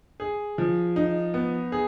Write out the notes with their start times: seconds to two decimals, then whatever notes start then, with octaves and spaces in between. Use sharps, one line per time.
0.20 G#4
0.58 F3
0.96 D#4
1.34 B3
1.72 G#4